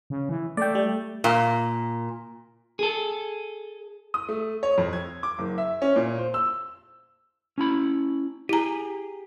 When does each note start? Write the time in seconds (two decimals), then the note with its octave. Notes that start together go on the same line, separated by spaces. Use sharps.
0.10 C#3
0.29 E3
0.57 A3 D5 G5
0.75 G3
1.24 A#2
2.79 G#4 A4
4.14 D#6
4.29 A3
4.63 C#5
4.78 F2
4.93 G#6
5.23 D6
5.38 F#1
5.58 E5
5.82 C#4
5.96 A#2
6.18 C5
6.34 E6
7.58 C#4 E4 B5
8.49 E4 G4 G#4 A#5